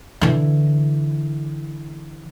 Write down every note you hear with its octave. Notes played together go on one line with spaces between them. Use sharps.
D3 E3